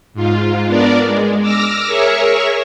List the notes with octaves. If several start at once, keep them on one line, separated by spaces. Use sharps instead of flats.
G#2 F4
B3 D4 A#4 D5
G#3
D6 E6 F6 A#6
G#4 A#4 C#5 E5 C#6